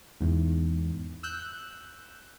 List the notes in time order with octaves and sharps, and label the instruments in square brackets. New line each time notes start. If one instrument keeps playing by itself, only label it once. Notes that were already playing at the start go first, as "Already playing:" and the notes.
[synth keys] E2 G#2
E6 F#6 G6